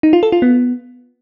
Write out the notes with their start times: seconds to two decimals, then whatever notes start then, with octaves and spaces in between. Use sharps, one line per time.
0.03 D#4
0.13 F4
0.23 A4
0.32 F4
0.42 B3